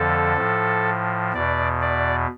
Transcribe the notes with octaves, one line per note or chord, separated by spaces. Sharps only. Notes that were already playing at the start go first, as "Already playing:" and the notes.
Already playing: F2 D3 F3 A4
A2 F3
E2 B2 D5
D5